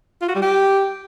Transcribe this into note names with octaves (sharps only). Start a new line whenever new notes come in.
F4
F#4
G3
G4